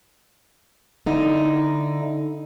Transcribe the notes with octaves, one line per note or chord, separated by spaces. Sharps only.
D3 D#4 E4